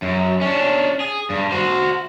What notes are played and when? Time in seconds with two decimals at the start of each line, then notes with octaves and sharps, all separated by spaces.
0.02 F#2
0.41 C#4 D4
1.00 G#4
1.30 G2
1.51 F#4 C5